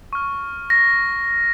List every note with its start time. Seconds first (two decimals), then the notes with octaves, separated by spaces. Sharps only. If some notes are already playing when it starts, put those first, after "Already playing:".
0.13 C#6 F6
0.70 A#6